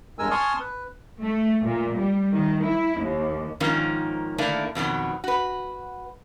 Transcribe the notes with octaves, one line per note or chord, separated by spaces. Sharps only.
E2 G2 G#3 A#4 G#5 E6
G#5 A5 C6 C#6 D#6 F6
B4
A3
A#2
G3
D#3
E4
D#2
G#2 D#3 F3 A#3 C#4 D#4
D3 D#3 A3 A#3 D4 E4
F2 B2 D#3 F#3
F#4 B4